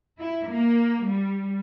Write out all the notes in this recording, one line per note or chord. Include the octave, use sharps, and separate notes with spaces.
E4
A#3
G3